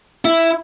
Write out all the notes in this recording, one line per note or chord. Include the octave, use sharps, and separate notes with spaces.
E4